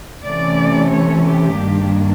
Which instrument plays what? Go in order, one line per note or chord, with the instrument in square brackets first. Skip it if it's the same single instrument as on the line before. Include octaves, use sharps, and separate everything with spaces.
[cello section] C3 E3 A3 C#4 D5
C#5
G4
G2 D#3 G3 A#3 D4